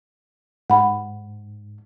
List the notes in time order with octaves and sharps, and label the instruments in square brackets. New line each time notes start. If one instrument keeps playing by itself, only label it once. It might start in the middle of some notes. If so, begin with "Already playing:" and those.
[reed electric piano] G#2 [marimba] F#5 B5